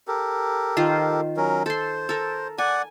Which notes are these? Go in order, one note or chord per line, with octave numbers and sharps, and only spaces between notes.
G4 A4 A#4
D#3 F4 C5
F#3 C#4 A#4
A4 C5 C6
A4 A#4
D5 F#5 G#5